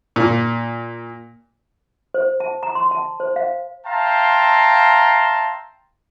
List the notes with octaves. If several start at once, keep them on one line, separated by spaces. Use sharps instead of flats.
A#2
C5
A5
A#5
C6
A5
C5
F5
E5 F5 G5 A5 A#5 C6